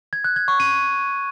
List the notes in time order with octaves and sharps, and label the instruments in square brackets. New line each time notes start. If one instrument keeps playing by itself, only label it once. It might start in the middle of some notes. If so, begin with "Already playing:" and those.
[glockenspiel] G#6
F#6
G#6
C#6
D#7